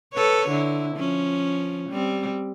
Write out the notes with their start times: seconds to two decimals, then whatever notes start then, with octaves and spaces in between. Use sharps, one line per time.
0.14 A4 B4 C#5
0.50 D3 E4
0.97 F3 C#4
1.90 G3 C4